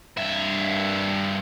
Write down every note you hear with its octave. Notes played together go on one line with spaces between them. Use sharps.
G2 E5